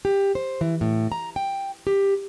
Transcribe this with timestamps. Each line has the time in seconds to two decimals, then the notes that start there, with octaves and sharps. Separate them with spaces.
0.05 G4
0.35 C5
0.61 E3
0.81 A2
1.12 A#5
1.36 G5
1.87 G4